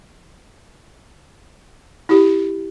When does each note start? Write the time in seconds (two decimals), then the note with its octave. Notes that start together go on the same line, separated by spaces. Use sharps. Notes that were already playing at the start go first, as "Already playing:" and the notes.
2.09 E4 G4